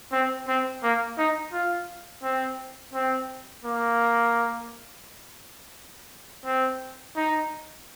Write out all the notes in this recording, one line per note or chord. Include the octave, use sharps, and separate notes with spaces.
C4
C4
A#3
D#4
F4
C4
C4
A#3
C4
D#4